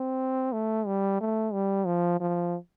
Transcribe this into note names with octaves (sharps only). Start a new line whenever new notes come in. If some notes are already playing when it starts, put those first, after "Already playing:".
Already playing: C4
A3
G3
A3
G3
F3
F3